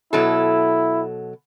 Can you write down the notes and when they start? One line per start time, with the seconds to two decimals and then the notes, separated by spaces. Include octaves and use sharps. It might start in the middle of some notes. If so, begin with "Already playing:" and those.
0.13 B2 F#3 E4 A4